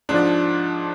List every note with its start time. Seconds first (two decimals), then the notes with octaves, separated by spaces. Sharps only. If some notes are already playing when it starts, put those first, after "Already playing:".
0.09 G#2 F3 D4